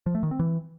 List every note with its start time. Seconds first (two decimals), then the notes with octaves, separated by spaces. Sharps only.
0.06 F3
0.15 A3
0.23 D#3
0.31 C4
0.39 E3